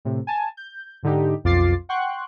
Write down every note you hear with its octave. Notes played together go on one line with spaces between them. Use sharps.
A2 C3
G#5 A5
G6
G#2 D3 D#4 G4
B1 F2 F4 D6 A6 C7
F#5 G5 C6 C#6 F#6